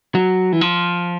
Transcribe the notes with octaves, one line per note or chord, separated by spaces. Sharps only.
F#3
E3
F3